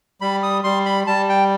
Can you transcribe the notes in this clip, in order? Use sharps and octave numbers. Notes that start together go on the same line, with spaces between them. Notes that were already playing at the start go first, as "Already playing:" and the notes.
G3 B5
D#6
G3 C6
B5
G3 A5
G5